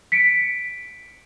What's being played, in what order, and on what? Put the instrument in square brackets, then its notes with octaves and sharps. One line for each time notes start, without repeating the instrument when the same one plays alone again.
[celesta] B6 C#7 D7